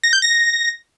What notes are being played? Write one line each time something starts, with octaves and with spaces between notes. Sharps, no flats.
A#6
G6
A#6